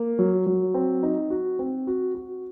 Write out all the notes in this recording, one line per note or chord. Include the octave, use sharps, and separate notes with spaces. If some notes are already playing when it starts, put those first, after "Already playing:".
Already playing: A#3
F#3
F#3
C4
D#4
F#4
C4
F#4
F#4